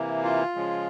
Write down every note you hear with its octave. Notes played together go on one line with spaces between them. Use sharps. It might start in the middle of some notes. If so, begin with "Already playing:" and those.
Already playing: C3 E3 A#3
F4
C#3 F3 G#3